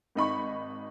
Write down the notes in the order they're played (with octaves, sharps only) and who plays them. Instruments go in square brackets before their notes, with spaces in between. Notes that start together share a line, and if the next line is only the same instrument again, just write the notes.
[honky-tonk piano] G#1 D#4 B5 C#6